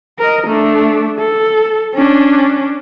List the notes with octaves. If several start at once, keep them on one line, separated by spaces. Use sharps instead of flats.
A#4 D#5
A3 D4
A4
C#4 D4